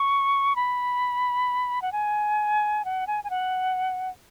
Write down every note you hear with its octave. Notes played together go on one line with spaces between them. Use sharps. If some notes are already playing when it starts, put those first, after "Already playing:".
Already playing: C#6
B5
F#5
G#5
F#5
G#5
G#5
F#5